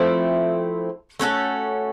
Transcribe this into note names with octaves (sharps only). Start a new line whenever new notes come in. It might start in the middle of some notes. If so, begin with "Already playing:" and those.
Already playing: F3 A3 C4 E4
A3 C#4 F#4 A4